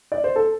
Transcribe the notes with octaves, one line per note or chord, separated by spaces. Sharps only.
D5
C5
A4